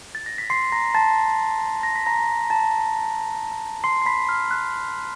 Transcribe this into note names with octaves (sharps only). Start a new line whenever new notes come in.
A6
A#6
B6
C6 C7
A#5 A#6
A5 A6
A#6
B6
A#5 A#6
A5 A6
C6 C7
C7
B5 B6
F6
F#6